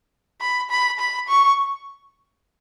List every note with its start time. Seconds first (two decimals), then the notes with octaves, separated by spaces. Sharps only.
0.41 B5
0.70 B5
0.99 B5
1.28 C#6